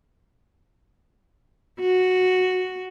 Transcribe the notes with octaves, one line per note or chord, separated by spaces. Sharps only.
F#4